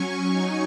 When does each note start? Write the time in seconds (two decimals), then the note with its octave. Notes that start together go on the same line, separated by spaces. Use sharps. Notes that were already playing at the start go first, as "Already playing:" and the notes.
Already playing: F#3 C#4 G#5 C#6
0.28 F#3 D#4